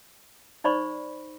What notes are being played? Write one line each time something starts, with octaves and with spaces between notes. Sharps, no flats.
D#4 C5 D5 B5 C#6